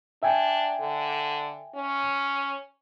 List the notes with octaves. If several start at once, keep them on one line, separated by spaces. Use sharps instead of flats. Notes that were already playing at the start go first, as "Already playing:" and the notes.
D4 E5 G5 G#5
D3
C#4